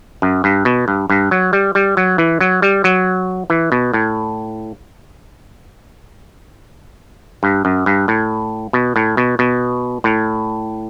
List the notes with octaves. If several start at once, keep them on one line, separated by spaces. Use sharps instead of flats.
F#2
G2
B2
G2
G2
F#3
G3
G3
F#3
E3
F#3
G3
F#3
E3
B2
A2
G2
F#2
G2
A2
B2
A2
B2
B2
A2